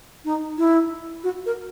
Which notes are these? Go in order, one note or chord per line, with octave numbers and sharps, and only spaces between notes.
D#4
E4
F#4
A#4